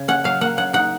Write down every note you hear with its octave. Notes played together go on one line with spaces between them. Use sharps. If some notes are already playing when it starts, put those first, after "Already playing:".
Already playing: C#3
C#4 F#5
F#3 F5
A#3 F#5
C#3 F#5
D#4 F#5